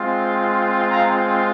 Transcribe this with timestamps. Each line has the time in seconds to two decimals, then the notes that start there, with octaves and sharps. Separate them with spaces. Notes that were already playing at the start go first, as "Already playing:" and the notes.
Already playing: G#3 C4 F4
0.91 F5 A#5